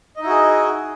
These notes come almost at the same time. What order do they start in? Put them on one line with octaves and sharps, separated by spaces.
D#5 D#4 E4 F#4 G#4